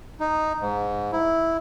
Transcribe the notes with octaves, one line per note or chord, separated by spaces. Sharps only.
D#4
G#2
E4